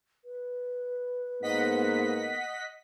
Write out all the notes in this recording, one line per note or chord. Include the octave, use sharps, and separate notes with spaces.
B4
G#2 A#3 B3 D#5 F#5 B6